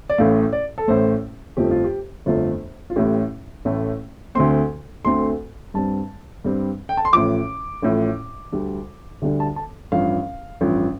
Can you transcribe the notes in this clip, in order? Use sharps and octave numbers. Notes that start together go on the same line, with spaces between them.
D5
A1 A2 A3 F5
D5
A4
A1 A2 A3 C5
G1 F2 F3 A3 G4
F4
G4
G1 F2 F3 A3 F4
F4
A1 A2 A3 G4
A1 A2 A3
D2 D3 A3 C4 C6
D2 D3 A3 C4 C6
G2 G3 C4 A5
G2 G3 C4
G5
A5
C6
A1 A2 F3 D6
A1 A2 F3
D2 D3 G3 D4
D2 D3 G3 D4
A5
A5
A1 G2 F3 F5
A1 G2 F3